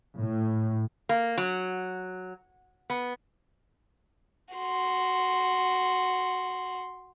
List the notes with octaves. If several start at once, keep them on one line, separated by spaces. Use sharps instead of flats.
A2
A#3
F#3
B3
F#4 C6